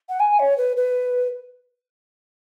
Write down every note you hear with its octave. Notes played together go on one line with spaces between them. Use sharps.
F#5
G#5
C#5
B4
B4